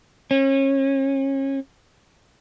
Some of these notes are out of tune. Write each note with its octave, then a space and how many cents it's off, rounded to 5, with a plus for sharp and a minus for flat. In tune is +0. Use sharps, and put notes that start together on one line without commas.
C#4 -30